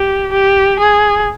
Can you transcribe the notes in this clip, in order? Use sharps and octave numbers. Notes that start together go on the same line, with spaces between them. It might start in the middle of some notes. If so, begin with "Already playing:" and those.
Already playing: G4
G4
G#4